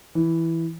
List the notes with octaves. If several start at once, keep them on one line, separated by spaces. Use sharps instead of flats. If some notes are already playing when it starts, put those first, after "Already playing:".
E3